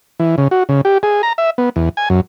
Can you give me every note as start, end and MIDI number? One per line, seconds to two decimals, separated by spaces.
0.20 0.36 52
0.38 0.48 49
0.51 0.63 66
0.69 0.81 49
0.85 0.98 67
1.03 1.22 68
1.23 1.33 82
1.38 1.50 76
1.58 1.69 59
1.76 1.89 40
1.97 2.09 80
2.10 2.21 42